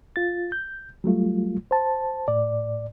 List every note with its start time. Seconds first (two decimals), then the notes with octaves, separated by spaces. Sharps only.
0.16 F4 A6
0.52 G6
1.04 F#3 G3 A3 F4
1.71 C5 A5
2.28 A2 D5